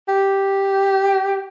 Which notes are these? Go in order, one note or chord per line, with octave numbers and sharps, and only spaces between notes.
G4